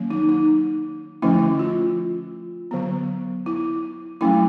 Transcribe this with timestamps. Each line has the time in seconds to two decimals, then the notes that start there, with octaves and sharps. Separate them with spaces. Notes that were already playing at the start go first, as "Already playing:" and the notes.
Already playing: D#3 F#3 A#3 C#4
0.10 D#4
0.29 D#4
1.22 D3 F3 A3 C#4 E4
1.59 F4
2.71 D3 F#3 B3
3.46 E4
4.21 F#3 A3 C#4 E4